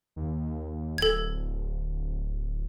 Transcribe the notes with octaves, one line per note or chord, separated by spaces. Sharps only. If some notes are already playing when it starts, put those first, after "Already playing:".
D#2
D1 A4 G#6